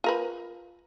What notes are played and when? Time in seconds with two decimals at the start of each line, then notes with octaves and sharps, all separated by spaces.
0.04 F4 A#4 B4